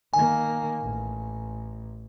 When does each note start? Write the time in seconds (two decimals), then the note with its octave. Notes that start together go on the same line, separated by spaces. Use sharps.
0.14 D#3 A#3 G#5
0.82 A1